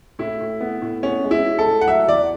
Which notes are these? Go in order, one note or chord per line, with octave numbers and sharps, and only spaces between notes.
A2 E4
A2
B3
A2
B3 C#4
G#3
E4
G#3
A4
A2
F#5
F#3 E5
E2 D5